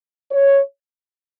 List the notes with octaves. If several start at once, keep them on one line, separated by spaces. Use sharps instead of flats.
C#5